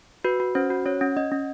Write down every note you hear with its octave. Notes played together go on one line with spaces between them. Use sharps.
F#4 B4
F#4
C#4 C5
F#4
C#4 C#5
C#4
C#4 D#5
C#4